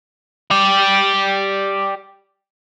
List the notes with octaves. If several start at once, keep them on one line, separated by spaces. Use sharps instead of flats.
G4 D5